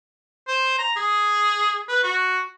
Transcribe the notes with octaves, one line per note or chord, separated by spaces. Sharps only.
C5
A#5
G#4
B4
F#4